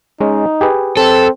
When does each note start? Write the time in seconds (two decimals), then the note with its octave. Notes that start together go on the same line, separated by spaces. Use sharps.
0.21 G#3 C#4 D#4
0.61 G4 G#4 B4
0.97 C4 A4